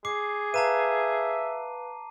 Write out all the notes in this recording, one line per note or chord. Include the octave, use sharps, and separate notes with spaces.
G#4 D6 C7
B4 E5 F5 A5 A#5 D#7